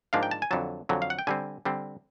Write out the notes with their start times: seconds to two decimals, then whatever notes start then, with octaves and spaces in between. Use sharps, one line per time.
0.13 G#2 F3 A#3 D4 F5
0.23 G5
0.31 A5
0.42 G#5
0.51 F2 D3 F#3 A5
0.89 F2 D3 F#3
1.02 F5
1.10 F#5
1.19 G5
1.27 D3 G3 C4 G#5
1.65 D3 G3 C4